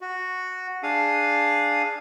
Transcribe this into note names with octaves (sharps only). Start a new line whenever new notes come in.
F#4
D4 G#4 F5 D#6